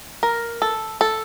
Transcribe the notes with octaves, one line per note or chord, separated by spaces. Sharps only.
A#4
A4
A4